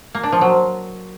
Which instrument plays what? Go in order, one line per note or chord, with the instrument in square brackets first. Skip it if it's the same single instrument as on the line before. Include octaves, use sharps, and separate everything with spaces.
[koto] A#3
D4
F3
F#3